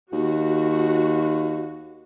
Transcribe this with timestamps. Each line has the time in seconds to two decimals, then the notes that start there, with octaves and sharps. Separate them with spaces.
0.12 D#2 F#4